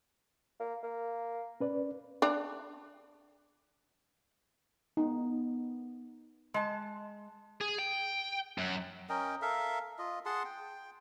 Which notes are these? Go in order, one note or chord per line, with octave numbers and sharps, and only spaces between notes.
A#3
A#3
C#4 B4 D5
D4 D5
B3 D#4
G#3 A5
G#4
G5
F#2
C#4 A#4 D#5 G5
A4 A#4 E5 F5
F4 D#5
G#4 F#5 A5 C6
G5